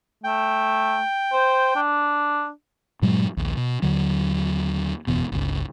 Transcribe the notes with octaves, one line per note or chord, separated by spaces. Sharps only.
A3 G5
C5
D4
G2 A#2 F#3 G#3
A#1 D#2
B2
D#2 D3 F#3
F#1 E2 B2
G1 C#2